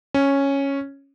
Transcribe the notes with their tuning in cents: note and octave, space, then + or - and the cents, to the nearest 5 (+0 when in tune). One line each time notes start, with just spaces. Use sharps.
C#4 -5